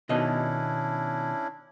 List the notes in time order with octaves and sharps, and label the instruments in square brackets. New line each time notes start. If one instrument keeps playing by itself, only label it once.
[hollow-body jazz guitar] B2 D#3 D#5 [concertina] C#4 D4 E4